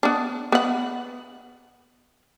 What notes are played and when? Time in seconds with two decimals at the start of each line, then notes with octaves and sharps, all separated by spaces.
0.03 B3 D4
0.52 B3 F#5